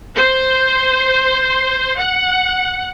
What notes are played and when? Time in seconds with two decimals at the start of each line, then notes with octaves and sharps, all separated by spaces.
0.16 C5
1.98 F#5